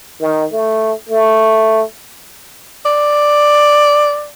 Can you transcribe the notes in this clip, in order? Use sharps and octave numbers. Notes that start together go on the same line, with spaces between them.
D#3
A3
A3
D5